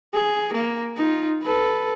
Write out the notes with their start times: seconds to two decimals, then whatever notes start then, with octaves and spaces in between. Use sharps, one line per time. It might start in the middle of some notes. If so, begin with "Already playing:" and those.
0.14 G#4
0.53 A#3
0.96 D#4 F4
1.42 A4 B4